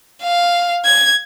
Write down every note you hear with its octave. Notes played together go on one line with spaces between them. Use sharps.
F5
G#6